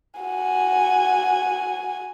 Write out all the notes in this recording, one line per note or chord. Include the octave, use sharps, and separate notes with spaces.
F#4 G#5